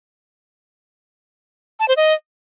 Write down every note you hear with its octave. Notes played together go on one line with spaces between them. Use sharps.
A5
C5
D#5